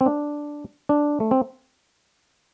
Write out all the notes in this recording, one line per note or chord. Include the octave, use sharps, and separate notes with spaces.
C4
D4
D4
A3
C4